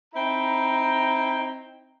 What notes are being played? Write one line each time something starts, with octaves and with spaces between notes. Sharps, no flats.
C4 D#4 E4 G5 A#5